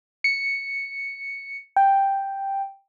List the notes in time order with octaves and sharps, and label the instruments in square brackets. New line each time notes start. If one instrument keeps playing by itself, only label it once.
[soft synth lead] C#7
G5